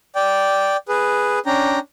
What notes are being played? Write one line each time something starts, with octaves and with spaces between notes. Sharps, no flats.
D5 G5
G#4 B4
C#4 D4 G5 A#5